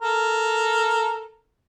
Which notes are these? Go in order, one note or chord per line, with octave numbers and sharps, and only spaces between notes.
A4 A#4